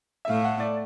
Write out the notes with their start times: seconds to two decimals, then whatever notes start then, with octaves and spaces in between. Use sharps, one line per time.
0.25 E5
0.29 A2 A3 F5
0.44 F#5
0.60 D5